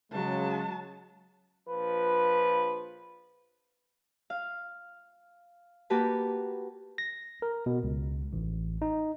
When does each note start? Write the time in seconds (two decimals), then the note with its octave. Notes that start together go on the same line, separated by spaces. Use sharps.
0.12 C#3 F#3 G#3 A5
1.69 A#1 F3 B4
4.30 F5
5.90 A#3 F#4 G4 B4 A5
6.98 A#6
7.42 A#4
7.66 B2
7.84 C#2
8.33 A1
8.82 D#4